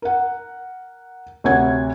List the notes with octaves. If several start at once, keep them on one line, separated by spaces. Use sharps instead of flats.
A#4 F#5
D2 C3 C#5 F#5 G#6